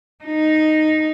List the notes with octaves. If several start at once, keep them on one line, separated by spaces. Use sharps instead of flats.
D#4